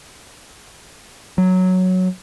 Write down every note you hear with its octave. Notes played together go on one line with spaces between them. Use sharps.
F#3